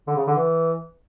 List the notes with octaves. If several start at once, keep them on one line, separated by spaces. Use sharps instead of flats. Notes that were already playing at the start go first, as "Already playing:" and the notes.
D3
C#3
D3
E3